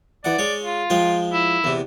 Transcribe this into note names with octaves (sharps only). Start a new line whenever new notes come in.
E2 D5 F#5
G#3 C#5
F4
F3 G#3 G5
E4
E2 C3